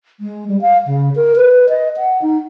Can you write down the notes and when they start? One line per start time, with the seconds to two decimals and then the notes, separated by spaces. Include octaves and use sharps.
0.20 G#3
0.48 G3
0.61 F5
0.87 C#3
1.16 A#4
1.36 B4
1.69 D#5
1.98 F#5
2.22 D#4